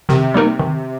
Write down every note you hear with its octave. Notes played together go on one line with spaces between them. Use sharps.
C3 D#3
G3 A#3 D#4 A#4
D#3